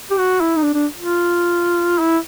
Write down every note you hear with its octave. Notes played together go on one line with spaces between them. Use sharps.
G4
F#4
E4
D#4
D4
D4
F4
E4